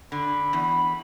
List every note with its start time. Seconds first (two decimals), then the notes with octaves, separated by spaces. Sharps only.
0.12 D3 B5
0.53 E2